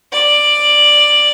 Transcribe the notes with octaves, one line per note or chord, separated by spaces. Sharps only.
D5